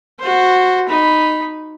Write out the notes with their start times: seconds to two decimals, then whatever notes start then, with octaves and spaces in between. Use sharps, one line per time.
0.20 F#4 C5
0.88 D#4 B5